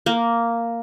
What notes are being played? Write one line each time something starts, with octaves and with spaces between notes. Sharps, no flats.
A#3